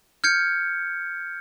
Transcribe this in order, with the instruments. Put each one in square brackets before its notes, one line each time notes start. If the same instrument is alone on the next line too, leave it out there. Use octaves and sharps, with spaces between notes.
[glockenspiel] F6 G6 G#6 C#7